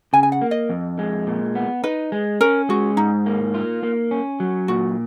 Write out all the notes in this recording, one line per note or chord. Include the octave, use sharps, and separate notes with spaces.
C#3 G#5
G#5
F#5
A#3
D#5
F2
G#3
A#2
B3
D#4 B4
G#3
C#4 A#4
G#3 F#4
G#2 D#4
A#3
F4
A#3
C#4
F#3
A#2 F#4